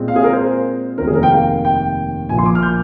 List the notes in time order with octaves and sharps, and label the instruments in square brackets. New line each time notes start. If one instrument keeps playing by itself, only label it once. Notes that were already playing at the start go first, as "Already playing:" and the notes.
Already playing: [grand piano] A#2 G#3 C4
F5
G#4
A#4
C5
F1 D#2 D#3 A#4
G#4
A#4
G5
F5
G5
A#1 A#2 F3 A#3 G#5
C6
D6
F6
G6